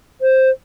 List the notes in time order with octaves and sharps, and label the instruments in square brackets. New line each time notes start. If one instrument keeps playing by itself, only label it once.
[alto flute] C5